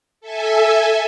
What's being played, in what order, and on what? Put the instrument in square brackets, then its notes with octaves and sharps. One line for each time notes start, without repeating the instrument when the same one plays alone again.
[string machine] A4 E5 G#5